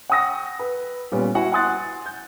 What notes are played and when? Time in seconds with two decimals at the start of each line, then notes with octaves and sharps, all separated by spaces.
0.10 F#5 G5 C#6 D#6 E6 A#6
0.59 B4
1.12 A#2 G3 B3 C#4
1.35 E4 F#4 F#5
1.52 F#5 G#5 C6 D#6 F#6 A6
2.06 G6